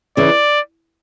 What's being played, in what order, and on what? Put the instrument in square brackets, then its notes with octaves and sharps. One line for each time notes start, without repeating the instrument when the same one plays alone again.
[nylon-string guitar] C#3 E3 [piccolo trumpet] D5